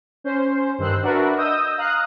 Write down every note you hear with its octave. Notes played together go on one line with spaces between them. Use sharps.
C#4 C5
G2 D#3 C5 E6 F#6
D4 F#4 A#4 B4 E5
D#5 D#6 E6 G6
F5 A#5 D#6 F#6